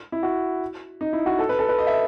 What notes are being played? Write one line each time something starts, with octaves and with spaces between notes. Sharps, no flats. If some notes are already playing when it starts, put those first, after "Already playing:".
E4
F#4
D#4
E4
F#4
A4
B4
A4
B4
D#5
E5